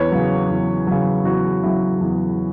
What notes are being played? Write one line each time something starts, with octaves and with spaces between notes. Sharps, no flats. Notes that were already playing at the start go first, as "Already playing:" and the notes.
Already playing: E2 B4 C#5
C#3 F#3
E2
C#3 F#3
E2 F#4
C#3 F#3 E4
E2